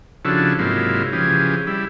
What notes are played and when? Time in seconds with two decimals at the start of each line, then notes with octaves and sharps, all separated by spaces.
0.25 C#3 F3 D4 E4 F#4 A4
0.59 G#2 C3 F#3 A#3 E4 F4
1.13 C#3 E3 F3 G4 G#4
1.67 G3 E4